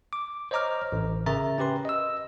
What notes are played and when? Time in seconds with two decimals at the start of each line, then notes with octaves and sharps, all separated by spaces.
0.13 D6
0.51 C5 C#5 D#5 A#5 D6 F6
0.92 A1
1.26 C#3 A#4 E5 A#5 A6
1.58 C#4 G4 B4 C6
1.85 D#5 E6